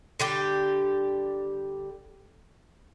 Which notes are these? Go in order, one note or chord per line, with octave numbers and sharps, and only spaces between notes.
D3 G3 G4